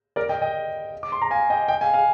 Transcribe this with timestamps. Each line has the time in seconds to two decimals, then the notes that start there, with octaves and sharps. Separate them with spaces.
0.16 A#4 D5
0.29 D#5 G5
0.42 D#5 G5
1.03 D6
1.12 C6
1.22 A#5
1.31 F5 G#5
1.50 D#5 G5
1.68 D#5 G5
1.81 F5 G#5
1.94 F5 G#5